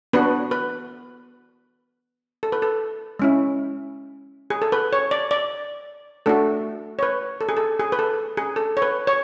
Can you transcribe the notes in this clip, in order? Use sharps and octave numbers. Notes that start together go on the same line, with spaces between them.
B3 D4 F#4 B4
B4
A4
B4
A4
G#3 C#4 E4
G#4
A4
B4
C#5
D5
D5
A3 D4 F#4 A4
C#5
B4
A4
G#4
A4
G#4
B4
A4
G#4
A4
C#5
B4
C#5